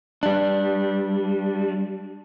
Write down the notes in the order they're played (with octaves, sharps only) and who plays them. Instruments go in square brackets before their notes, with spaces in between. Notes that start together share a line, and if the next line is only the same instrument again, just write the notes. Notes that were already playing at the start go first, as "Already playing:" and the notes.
[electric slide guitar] G3 D4